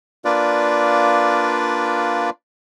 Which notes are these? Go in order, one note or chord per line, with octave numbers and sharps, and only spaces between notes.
A#3 D4 F4 B4 D5